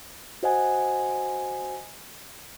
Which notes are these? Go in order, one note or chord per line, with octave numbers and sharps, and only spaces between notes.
F#4 C5 D#5 F#5 G#5